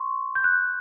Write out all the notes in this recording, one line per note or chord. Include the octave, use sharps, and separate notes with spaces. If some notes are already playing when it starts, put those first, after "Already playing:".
Already playing: C6 C#6
G6
F#6